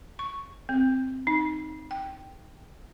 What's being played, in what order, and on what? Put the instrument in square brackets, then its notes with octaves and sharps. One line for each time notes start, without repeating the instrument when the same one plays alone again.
[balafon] C#6
C4
D#4
G5